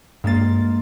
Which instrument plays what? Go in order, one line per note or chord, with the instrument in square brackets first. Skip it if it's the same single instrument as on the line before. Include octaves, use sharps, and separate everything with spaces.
[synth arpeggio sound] G2 A6 [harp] G#3 A#3 F4